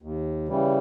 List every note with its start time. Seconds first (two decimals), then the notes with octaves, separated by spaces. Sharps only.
0.02 D#2
0.48 C#3 E3 G3